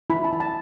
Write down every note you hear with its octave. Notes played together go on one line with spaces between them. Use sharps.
E4 B5
A5
E4
A5